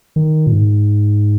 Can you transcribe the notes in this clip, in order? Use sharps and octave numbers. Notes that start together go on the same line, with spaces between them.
D#3
A#2
G#2